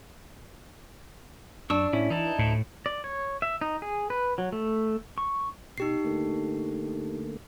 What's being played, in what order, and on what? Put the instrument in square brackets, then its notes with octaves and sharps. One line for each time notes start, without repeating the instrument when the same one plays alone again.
[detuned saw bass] F#2 [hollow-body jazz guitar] D4 [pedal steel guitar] C#6 E6
[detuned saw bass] A2 [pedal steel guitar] C#4 E4
[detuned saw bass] E3 [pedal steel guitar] D#4 E4 A5
[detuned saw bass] D2 [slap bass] A2
[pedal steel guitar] D5
C#5
E5
D#4
G#4
B4
F#3
A3
C#6
[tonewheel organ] B2 [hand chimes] D#4 G4 C7
[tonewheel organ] D3 A3 A#3